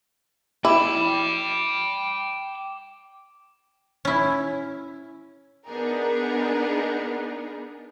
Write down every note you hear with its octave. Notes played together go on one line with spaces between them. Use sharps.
E4 G5 B5 D6
C#4 E4
B3 D4 D#4 G#4 A#4